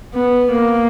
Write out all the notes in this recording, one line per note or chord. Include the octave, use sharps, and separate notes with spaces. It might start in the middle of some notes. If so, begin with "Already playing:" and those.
B3
A#3